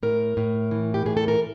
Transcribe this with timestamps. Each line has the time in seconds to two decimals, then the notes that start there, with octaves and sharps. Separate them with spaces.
0.03 A2 A#4
0.37 A2
0.71 E3
0.94 G4
1.06 A2 G#4
1.17 A4
1.28 A#4